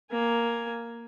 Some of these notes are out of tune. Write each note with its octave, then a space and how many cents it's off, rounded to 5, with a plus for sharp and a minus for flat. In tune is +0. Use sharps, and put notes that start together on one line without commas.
A#3 +0 G#5 +0